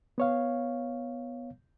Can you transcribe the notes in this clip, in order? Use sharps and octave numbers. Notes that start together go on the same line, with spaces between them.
B3 C#5 F5